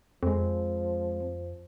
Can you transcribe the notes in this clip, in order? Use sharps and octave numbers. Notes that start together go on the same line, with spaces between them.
F2 F3 G#3 C4